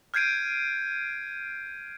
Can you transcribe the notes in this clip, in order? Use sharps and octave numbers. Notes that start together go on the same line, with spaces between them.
F6 G6 G#6 C7 D7 D#7